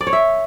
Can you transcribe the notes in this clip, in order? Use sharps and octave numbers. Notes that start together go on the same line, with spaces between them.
D5
C#5
E5